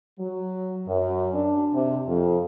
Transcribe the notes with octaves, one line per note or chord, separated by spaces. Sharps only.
F#3
F#2
D4
C3
F2